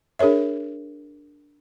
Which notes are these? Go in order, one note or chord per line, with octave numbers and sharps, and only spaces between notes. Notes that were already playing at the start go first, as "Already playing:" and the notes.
D4 G#4 A#4 C#5 E5